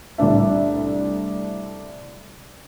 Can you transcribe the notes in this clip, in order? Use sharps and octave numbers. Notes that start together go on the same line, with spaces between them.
C2 A3 D4 E5